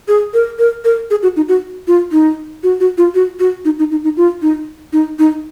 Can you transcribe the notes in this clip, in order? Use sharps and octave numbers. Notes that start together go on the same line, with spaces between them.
G#4
A#4
A#4
A#4
G#4
F#4
D#4
F#4
F4
D#4
F#4
F#4
F4
F#4
F#4
D#4
D#4
D#4
D#4
F4
D#4
D#4
D#4